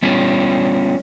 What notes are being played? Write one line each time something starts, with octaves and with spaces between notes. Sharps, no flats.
G3 B3 C#4 F4